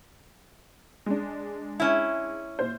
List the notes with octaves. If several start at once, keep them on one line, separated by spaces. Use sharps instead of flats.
G#3 D4
C#4 E4
A#2 C5